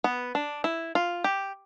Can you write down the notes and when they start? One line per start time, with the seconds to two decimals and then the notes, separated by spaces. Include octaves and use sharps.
0.04 B3
0.35 D4
0.64 E4
0.95 F4
1.24 G4